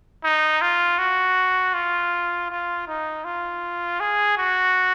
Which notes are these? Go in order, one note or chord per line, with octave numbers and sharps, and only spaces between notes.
D#4
F4
F#4
F4
F4
D#4
F4
G#4
F#4